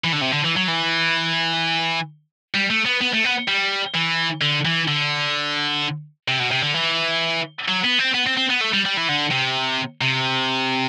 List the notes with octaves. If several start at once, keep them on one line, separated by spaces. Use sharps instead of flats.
E3
D3
C3
D3
E3
F#3
E3
G3
A3
B3
B3
A3
B3
G3
E3
D3
E3
D3
C3
B2
C3
D3
E3
F#3
B3
C4
B3
C4
C4
B3
A3
G3
G3
E3
D3
C3
C3